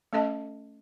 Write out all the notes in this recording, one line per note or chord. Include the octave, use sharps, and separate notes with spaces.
A3 C#4 A4 D#5 A5